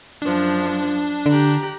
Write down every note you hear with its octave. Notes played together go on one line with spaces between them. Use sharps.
F#2 F3 D4
D3 G4 A#5 F#6